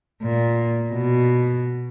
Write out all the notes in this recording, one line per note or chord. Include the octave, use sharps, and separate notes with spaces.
A#2
B2